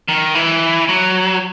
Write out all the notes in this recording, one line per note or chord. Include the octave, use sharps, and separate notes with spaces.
D#3
E3
F#3